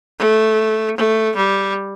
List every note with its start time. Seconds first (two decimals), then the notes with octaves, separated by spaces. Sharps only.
0.19 A3
0.97 A3
1.37 G3